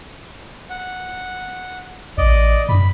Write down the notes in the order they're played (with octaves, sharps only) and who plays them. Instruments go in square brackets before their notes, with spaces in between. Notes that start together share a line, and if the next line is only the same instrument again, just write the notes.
[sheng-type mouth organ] F#5
[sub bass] A1 [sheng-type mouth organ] D5 D#5
[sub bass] F#2 [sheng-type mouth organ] B5